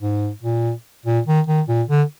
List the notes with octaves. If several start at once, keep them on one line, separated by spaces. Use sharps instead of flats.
G#2
A#2
A#2
D#3
D#3
A#2
D3